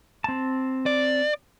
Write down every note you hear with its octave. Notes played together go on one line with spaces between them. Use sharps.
C4 A5
D5